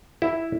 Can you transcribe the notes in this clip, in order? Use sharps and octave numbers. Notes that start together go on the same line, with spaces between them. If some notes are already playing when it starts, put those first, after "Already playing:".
E4